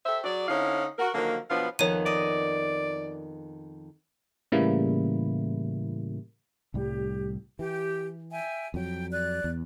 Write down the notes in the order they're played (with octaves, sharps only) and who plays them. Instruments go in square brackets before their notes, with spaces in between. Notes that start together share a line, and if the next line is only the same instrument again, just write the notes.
[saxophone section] G4 A4 C5 E5
F#3 F#4 G#4 D5
D3 C4 C#4 D#4 E4 F5
F#4 A#4
D3 D#3 F3 F#3 A#3
B2 F3 F#3 B3 D4 F5
[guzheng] F2 D#3 B3 [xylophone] C#5 D#7
[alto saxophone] D5 [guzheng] D#5
[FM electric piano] A2 C#3 E3 G3 A#3 E4
[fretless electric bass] C2 A2 G3 [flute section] G4
[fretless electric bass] E3 [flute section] G4 G5
[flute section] E5 G5 G#5
[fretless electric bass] F2 F#3 [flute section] G5
[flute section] D5 F#6
[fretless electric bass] E2